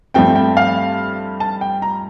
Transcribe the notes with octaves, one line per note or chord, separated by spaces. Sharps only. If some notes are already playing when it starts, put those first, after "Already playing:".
G2 F3 A3 C4 G5
G5
F5
A5
G5
A#5